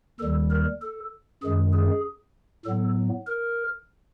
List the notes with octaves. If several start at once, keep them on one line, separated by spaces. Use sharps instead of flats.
D#2 D#3 G3 A4
A#4
A4
F#2 D#3 G#3 G#4
G#4
A2 F#3 B3 A4
A#4